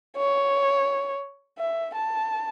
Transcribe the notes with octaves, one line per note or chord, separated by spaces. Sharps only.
C#5
E5
A5